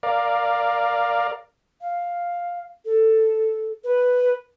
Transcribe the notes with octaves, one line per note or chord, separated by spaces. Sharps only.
A#4 D5 F5
F5
A4
B4